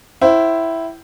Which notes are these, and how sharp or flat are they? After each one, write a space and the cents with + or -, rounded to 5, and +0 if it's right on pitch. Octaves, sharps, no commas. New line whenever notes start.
E4 +0 C5 +0 G5 -45